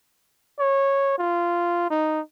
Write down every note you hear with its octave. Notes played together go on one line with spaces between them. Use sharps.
C#5
F4
D#4